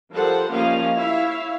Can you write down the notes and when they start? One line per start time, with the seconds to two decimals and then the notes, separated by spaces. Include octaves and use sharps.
0.12 F3 G3 A4 A#4 C5 F#5
0.50 F3 G3 A#3 C#4 D#5 F5
0.94 E4 C#5 E5 F5